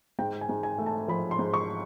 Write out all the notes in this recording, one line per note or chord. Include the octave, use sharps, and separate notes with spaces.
G#2 G5
G#5
G#2
G#5
A3
A5
F3 B5
C6
G#2
C#6